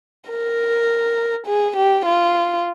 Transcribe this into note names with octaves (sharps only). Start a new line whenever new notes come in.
A#4
G#4
G4
F4